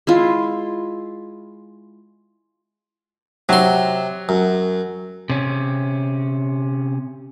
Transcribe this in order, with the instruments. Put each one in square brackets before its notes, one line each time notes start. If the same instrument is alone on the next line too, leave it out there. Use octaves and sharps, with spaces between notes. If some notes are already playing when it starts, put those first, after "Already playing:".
[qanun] G#3 E4 F4
[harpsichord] C3 C6 [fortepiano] F#3
[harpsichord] F#2
[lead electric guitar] C3 C#4